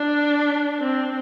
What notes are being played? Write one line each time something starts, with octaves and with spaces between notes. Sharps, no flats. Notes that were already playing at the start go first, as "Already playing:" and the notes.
Already playing: D4
C4